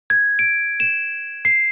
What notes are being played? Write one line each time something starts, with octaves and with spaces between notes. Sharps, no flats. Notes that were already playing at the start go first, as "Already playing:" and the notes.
G#6
D7
E7
C7